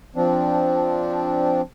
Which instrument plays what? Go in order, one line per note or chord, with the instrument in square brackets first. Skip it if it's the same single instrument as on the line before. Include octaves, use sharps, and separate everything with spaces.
[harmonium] F3 C4 D4